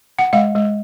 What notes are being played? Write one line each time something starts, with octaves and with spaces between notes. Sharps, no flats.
F#5
G#3 F5
G#3